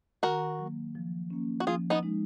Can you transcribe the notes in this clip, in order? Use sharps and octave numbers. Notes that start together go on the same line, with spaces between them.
D#3 F#4 A#4
F#3 A#3
F3
A#3 C#4
F#4
F3 F4 G#4
B3 D#4
G#3 D#4